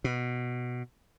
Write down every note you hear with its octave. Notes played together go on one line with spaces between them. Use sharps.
B2